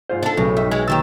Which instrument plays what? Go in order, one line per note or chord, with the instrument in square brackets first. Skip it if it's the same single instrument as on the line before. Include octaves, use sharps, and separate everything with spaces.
[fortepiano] G#2 F4 C5
[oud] D4 A4
[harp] B1 [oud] A2 [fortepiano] C#3
[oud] G2 [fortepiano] D#4 E5
[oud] G#3
[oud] D#2 D#3 G4 [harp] E6 A6